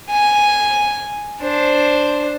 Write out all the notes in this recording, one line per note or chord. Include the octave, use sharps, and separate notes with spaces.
G#5
D4 C5